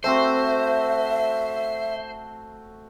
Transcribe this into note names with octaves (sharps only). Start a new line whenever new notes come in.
A3 C4 F#4 C5 E5